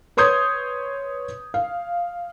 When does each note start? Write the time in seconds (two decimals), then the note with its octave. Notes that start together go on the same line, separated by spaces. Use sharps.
0.17 B4 C#5 C6 D#6 G6 G#6
1.54 F5